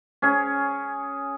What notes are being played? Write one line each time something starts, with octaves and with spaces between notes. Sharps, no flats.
C#4 G#4